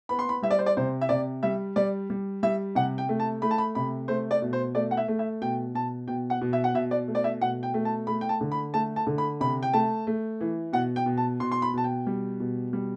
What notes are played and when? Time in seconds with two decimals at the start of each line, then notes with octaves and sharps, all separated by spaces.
0.09 B3 B5
0.19 C6
0.29 B5
0.42 G3 E5
0.51 D5
0.59 C5
0.66 D5
0.77 C3 C5
1.01 E5
1.09 C3 D5
1.43 G3 E5
1.76 G3 D5
2.10 G3
2.43 G3 E5
2.75 C3 F#5
2.98 G5
3.09 A3
3.20 A5
3.42 A3 B5
3.51 A5
3.58 B5
3.75 C3 B5
4.08 A3 C5
4.31 D5
4.42 B2
4.53 C5
4.75 A3 D5
4.91 F#5
4.97 E5
5.08 A3
5.19 E5
5.41 B2 G5
5.75 B2 A5
6.07 B2 G5
6.30 F#5
6.41 B2
6.53 E5
6.64 F#5
6.74 B2 E5
6.91 D5
7.08 A3
7.15 D5
7.24 E5
7.41 B2 F#5
7.63 G5
7.74 A3
7.85 A5
8.07 A3 B5
8.21 G5
8.29 A5
8.41 D3
8.52 B5
8.74 A3 A5
8.96 A5
9.07 D3
9.18 B5
9.41 C3 B5
9.63 G5
9.73 A3 A5
10.07 A3
10.41 E3
10.73 B2 F#5
10.96 G5
11.06 B2
11.18 A5
11.40 B2 C6
11.52 C6
11.62 B5
11.74 B2 A5
11.84 G5
12.07 G3
12.40 B2
12.73 G3